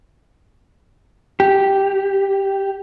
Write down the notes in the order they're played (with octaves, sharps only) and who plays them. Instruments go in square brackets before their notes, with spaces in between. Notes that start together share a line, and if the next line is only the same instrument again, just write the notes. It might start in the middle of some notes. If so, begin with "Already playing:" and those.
[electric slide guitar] G4